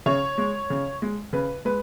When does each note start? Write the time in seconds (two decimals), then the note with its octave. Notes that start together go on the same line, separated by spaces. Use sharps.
0.06 C#3 C#5
0.38 G#3
0.70 C#3
1.02 G#3
1.33 C#3 B4
1.65 G#3 B4